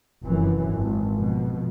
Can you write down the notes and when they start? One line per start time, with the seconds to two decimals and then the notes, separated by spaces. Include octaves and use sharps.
0.22 F1 F#2 E3
0.71 G#1
1.17 F2 B2